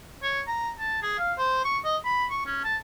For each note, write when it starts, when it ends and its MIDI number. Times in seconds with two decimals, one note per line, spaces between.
0.23 0.41 73
0.47 0.71 82
0.79 1.01 81
1.02 1.17 68
1.18 1.33 77
1.38 1.62 72
1.65 1.79 85
1.84 1.97 75
2.05 2.25 83
2.30 2.43 85
2.46 2.63 61
2.64 2.76 81